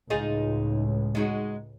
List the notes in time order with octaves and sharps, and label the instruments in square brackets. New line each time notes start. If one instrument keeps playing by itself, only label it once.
[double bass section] C#2 A2 [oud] D#4 F4 G#4
[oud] G#3 D#4 F#4